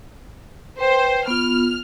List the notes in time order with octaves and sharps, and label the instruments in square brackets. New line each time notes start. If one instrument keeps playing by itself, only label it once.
[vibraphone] B4 G5 [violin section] C5
[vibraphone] B3 F4 [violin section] F6